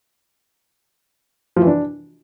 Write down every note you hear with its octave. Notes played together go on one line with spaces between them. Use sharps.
F3
E3
D4